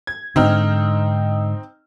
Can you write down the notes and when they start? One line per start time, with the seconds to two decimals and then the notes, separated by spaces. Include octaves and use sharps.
0.07 G#6
0.36 G#2 D3 C4 D#4 F6